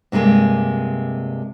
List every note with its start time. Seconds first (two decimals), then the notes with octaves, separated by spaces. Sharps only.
0.12 G2 C3 E3 G#3 A#3